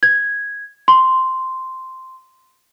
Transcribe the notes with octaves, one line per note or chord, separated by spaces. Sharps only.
G#6
C6